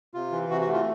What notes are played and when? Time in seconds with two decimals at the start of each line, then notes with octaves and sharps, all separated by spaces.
0.14 C3 F4
0.32 E3
0.50 C3 F#4
0.61 F#4
0.68 A3
0.73 F4